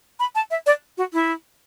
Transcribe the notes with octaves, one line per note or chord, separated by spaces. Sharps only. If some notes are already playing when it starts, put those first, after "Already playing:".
B5
A5
E5
D5
F#4
E4